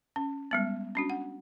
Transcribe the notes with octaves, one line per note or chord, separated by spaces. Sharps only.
C#4
G3 G#3 B3
C#4 D4 F#4
F#5